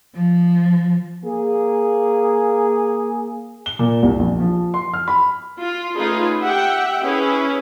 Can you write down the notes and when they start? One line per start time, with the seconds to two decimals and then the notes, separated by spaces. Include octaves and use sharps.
0.15 F3
1.24 A#3 G#4
3.66 G7
3.79 A#2
4.03 C2
4.19 A#1
4.40 F3
4.74 C6
4.94 F6
5.08 B5
5.59 F4
5.95 A3 C#4 D#4 F4 G#4 B4
6.40 G4 E5 F#5 G5
7.03 C#4 E4 G#4 B4